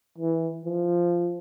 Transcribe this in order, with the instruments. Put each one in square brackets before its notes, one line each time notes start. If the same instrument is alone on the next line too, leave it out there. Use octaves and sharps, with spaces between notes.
[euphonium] E3
F3